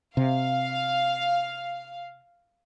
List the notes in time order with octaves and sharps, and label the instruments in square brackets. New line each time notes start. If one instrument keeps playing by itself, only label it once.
[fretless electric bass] C3 [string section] F5